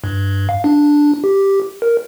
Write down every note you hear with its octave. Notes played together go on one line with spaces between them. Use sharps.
G2
F5
D4
G4
A#4